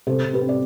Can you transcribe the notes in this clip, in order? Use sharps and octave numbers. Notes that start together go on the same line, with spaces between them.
C3 A4 C5
C3
G4 B4
C4
D5